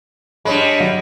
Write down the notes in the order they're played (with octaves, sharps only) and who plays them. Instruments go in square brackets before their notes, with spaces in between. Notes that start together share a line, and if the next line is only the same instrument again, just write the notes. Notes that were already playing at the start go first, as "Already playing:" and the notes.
[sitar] G3 G#3 [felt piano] D4 C#5 B5
[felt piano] F#3 C#7